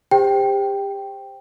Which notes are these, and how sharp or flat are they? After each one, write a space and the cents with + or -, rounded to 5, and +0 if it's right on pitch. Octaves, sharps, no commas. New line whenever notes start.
G4 +30 C5 +0 G5 +0